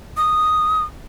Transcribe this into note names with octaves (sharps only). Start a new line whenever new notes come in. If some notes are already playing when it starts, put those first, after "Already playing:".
D#6